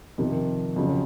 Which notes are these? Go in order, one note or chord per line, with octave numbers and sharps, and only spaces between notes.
F2 C3 D#3
F2 C#3 F#3